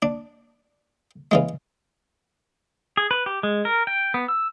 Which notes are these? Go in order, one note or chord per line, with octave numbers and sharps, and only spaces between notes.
D4
C#3 E3 G#3
G#4
B4
G4
G#3
A#4
G5
B3
E6